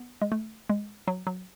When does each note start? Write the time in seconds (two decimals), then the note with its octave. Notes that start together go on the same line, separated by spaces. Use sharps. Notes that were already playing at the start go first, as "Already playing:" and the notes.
Already playing: B3
0.22 G#3
0.32 A3
0.69 G#3
1.08 F#3
1.27 F#3